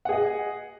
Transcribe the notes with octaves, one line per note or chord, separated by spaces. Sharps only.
G#4 D#5 F#5